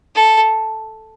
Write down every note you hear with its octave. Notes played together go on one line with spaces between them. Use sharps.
A4